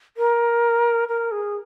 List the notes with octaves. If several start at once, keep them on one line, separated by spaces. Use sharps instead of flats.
A#4
A#4
G#4